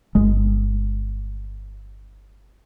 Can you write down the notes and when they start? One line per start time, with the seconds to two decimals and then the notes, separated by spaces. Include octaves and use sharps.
0.15 G1 G#3